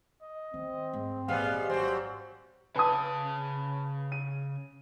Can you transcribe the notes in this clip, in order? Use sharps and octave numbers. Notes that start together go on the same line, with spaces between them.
D#5
D#3 C4
G#2
A#1 E3 G3 G#3 B3 F5
G#1 F#3 G3 C4 C5
C#3 B4 G#5 A5 D#6
D#7